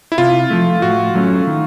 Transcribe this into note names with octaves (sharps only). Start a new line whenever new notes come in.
E4
C3 F4
F3 A3
A2 F#4
F#3 A3 C#4
D#3